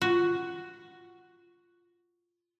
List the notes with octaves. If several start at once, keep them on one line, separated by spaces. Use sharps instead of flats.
F4 F#4